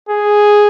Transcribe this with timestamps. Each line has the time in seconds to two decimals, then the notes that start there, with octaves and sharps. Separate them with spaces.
0.09 G#4